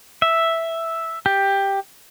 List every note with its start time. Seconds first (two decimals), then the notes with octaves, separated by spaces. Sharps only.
0.22 E5
1.26 G4